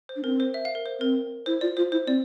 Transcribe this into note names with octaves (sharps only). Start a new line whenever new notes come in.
C5
D4
C4 A#4
C5
E5
F5
A#4
C5
C4 A#4
E4 C5
F4 D5
F4 C5
E4 C5
C4 D5